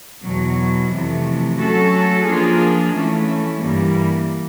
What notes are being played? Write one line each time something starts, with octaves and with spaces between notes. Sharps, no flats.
E2 B2 F#3
F2 C3 E3 A3
F#3 A3 C#4 F#4 A4
F3 A#3 D4 F4 G#4
E3 A3 C#4
G2 E3 G3 A#3